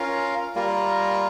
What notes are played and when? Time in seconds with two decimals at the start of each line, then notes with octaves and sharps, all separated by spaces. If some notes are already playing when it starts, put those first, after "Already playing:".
Already playing: C#4 F4 A#4 F5
0.55 G3 A#3 F4 A#4